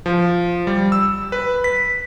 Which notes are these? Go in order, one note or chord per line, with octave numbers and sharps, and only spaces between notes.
F3
G3
E6
B4
B6